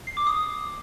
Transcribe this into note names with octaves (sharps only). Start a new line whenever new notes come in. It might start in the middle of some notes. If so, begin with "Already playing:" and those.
C7
D6
D#6